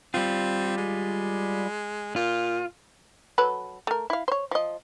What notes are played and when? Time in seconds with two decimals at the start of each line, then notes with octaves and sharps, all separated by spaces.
0.14 G3 C4 F4
0.78 G#3
2.16 A#2 F4
3.38 F#3 A4 B4
3.87 A3 A#4
4.10 E4 F5
4.28 C5 C#5
4.51 F3 D#5